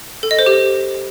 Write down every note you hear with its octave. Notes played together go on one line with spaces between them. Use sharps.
A4
D#5
C5
G4